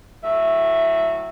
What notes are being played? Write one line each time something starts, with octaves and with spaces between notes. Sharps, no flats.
A2 F#3 E5